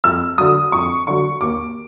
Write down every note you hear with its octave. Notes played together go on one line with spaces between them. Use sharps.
F2 E6
D3 F#3 D#6
F2 C#6
D3 F#3 C#6
D#2 D6